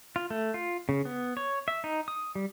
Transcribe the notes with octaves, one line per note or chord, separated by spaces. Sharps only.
F4
A3
F4
C#3
B3
C#5
E5
D#4
D#6
G3